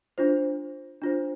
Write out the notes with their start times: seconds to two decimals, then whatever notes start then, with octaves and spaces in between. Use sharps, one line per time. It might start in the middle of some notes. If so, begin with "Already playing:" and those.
0.18 D4 F4 C5
1.02 D4 F4 C5